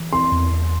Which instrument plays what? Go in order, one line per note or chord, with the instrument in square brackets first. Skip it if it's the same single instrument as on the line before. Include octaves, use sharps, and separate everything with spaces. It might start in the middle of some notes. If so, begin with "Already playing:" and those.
Already playing: [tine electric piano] E3
[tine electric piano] C4 [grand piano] C6
[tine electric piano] E2
E2